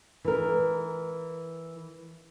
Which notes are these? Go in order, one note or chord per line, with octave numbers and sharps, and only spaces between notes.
E3 A#4